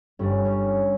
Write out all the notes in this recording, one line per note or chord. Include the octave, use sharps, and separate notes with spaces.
G1 G2 G3 C#4
C#4